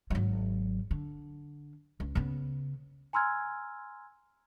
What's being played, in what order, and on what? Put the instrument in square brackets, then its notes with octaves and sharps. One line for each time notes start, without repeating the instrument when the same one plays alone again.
[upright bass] G#1 F#3
D3
C#2
C#3 B3
[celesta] G#5 A#5 C6 E6 F6 G#6